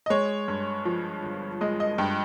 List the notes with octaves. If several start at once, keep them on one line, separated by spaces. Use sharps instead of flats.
D#5
G#3 C#5
G2
F3
G1
G#3 D#5
D#5
G2 G5